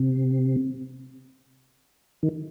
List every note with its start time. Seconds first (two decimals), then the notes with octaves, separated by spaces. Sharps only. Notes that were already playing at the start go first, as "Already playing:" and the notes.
Already playing: C3
2.23 D#3